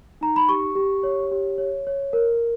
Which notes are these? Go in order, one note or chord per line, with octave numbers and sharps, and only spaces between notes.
D#4 A#5
B5
G4 C#6
G4
C#5
G4
C#5
C#5
A#4